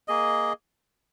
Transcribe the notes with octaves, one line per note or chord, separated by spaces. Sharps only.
A#3 G#4 D#5